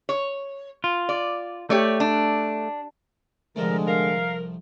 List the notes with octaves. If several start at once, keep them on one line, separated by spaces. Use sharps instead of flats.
C#5
F4
D5
A3 G4 C#5 D5
D4
C2 D3 F3 G#3 A3 A#4
A#4 F5